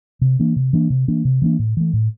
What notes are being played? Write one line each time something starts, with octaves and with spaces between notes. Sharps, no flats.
C3
E3 A#3 D4
C3
E3 A#3 D4
C3
E3 A#3 D4
C3
E3 A#3 D4
A2
E3 A3
A2